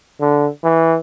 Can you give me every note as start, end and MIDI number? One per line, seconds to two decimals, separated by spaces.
0.21 0.48 50
0.64 0.97 52